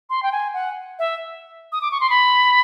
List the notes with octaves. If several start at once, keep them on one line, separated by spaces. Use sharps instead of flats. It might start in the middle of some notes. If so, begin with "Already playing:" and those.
C6
G5
G#5
F#5
E5
D#6
D6
C#6
C6
B5